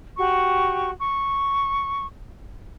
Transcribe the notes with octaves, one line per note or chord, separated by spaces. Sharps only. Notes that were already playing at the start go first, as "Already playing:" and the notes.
F#4 G4 C#6
C#6